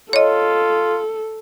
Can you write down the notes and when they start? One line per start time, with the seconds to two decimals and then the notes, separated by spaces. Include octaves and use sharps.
0.13 F4 A4 C#5 D#5